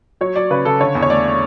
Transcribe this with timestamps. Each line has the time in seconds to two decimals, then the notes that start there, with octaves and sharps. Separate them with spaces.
0.21 F#3 C#5
0.36 F#3 D5
0.50 C#3 B4
0.65 C#3 A4
0.80 D3 C#5
0.95 E2
1.02 C#5
1.10 A3 D5